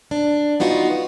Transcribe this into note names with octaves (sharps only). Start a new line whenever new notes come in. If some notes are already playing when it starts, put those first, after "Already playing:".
D4
B3 D#4 F4 F#4